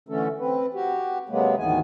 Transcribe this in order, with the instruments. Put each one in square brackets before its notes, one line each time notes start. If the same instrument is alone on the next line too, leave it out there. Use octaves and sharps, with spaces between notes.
[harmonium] D3 E3 A3 C#4 A4
C4 B4
F#4 G4
C3 F#3 G#3 A#3 B3
D2 G#2 D#3 E3 B3 G#5